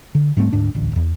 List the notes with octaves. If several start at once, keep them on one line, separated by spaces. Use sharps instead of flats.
D3
G#2 G3 A3 C4
D2 G#2 D4
D#1 A1 D2
D#1 E2